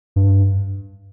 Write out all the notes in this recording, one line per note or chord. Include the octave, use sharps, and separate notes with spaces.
G2